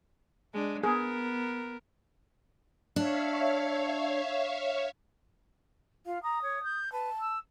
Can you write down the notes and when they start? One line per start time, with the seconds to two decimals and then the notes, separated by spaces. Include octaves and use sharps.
0.53 G#3 D4
0.83 B3 G#4 A#4
2.96 D4 C#5 E5 F5
6.06 F4 F5
6.23 A#5 D#6
6.42 C#5
6.63 G6
6.92 B4 A5
7.20 E6